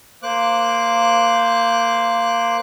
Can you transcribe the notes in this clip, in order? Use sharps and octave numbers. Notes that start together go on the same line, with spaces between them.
A#3 C5 D6 F#6